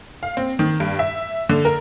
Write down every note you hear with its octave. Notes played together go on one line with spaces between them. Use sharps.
F5
C4
D#3
G2
E5
D3
A#4